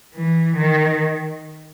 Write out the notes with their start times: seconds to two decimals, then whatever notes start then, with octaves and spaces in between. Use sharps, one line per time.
0.16 E3
0.57 D#3